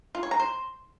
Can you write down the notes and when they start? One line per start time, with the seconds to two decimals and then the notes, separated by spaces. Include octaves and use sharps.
0.15 F4
0.23 C#5
0.31 A#5
0.40 C5